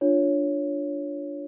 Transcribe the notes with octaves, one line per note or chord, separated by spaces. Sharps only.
D4 F4 C#5